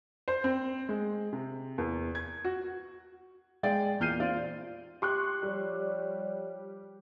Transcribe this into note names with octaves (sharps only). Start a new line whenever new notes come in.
C5
C4
G#3
C3
E2
G#6
F#4
G#3 G#4 D5 G5
E2 A#2 F6 G6 C7 D#7
C4 F4 D5
G4 C6 C#6 F#6
F3 G3 C#5 D5